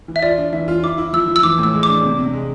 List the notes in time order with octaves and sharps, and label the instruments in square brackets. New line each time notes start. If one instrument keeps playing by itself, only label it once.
[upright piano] E3
[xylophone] E5
[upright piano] F4 [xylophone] D5
[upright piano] D4
[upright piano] E3 [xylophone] E5
[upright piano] F4
[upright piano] E4 [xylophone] D6
[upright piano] E4
[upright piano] F3 [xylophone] E6
[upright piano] F3
[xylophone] E6
[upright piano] E3 [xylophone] D6
[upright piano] A2
[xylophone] E6
[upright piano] G#3
[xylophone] D6
[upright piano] D4
C3
C3
G#3